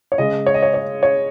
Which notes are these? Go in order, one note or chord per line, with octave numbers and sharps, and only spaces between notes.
C#5
C#3 G#3 D#5
C#5
D#5
C#5
C#5
C#5